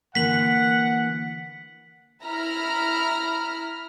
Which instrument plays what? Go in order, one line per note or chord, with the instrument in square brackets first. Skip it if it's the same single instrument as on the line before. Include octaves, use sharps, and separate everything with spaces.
[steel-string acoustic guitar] D3 E3 A#3 [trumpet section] F#5 [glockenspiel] B6 F#7
[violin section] E4 A#5 B5 F6